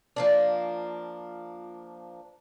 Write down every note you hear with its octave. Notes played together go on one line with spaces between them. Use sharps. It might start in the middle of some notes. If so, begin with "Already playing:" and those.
F3 A#3 D4